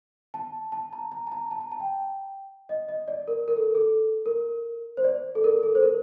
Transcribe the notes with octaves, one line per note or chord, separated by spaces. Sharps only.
A5
A5
A#5
A#5
A5
A#5
A5
A#5
A5
G5
D#5
D#5
D5
A#4
A#4
A4
A4
A#4
C5
D5
A4
A#4
A4
C5
A#4